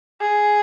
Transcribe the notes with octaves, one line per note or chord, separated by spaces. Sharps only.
G#4